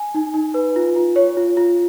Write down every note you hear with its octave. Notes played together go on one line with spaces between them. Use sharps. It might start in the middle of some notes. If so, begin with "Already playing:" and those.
Already playing: G#5
D#4
D#4
B4
F4
F4
C#5
F4
F4